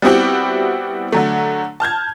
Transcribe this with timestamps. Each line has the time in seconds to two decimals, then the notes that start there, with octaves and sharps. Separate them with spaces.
0.02 G3 B3 C4 E4 F#4 G4
1.12 D3 F#3 A3
1.80 A5 F6 G6 G#6